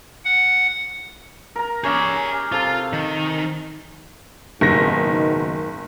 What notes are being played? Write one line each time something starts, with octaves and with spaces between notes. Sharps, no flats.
F#5
A#4 A#5
C#4 G4 G#4 E5
C3 F4 A4 G#5
D#3
F#1 G#2 B2 D#3 A#6